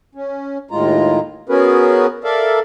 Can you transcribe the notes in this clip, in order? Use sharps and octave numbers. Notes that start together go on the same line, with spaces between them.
C#4
D#2 A2 G#3 F4 A#5
B3 C#4 F#4 G#4 A#4 B4
A4 A#4 D5 E5 F5